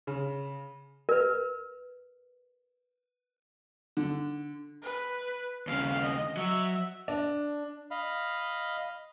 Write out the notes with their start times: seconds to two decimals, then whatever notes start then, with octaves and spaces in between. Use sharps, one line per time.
0.07 C#3
1.09 A#4 B4
3.97 D3
4.82 B4
5.67 D#2 C#3 F5
6.03 D#5
6.37 F#3 E5
7.08 D4
7.91 D#5 F5 B5